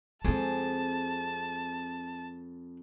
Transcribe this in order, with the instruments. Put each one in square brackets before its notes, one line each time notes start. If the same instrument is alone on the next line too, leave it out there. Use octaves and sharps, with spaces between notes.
[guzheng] F2 G#4 [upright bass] G#3 C4 [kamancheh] A5